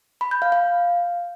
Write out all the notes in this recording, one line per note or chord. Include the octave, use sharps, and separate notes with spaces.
B5
G6
F5
F5